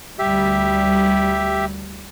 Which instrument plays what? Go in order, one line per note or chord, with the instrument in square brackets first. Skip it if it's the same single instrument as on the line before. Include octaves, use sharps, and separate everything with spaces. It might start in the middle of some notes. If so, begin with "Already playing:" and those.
[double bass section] D2 G3 [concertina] G4 E5